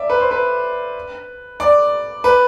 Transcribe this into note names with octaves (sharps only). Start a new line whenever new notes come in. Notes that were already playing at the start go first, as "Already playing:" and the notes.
Already playing: D5 E5
B4
C5
B4
D5
B4